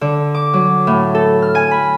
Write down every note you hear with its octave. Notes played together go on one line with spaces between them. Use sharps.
D3
D6
F#3
A2
A4
F6
G#5
B5